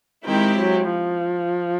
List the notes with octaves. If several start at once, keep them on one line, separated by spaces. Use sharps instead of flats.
D#3 G#3 C4 E4 G4
F#3
F3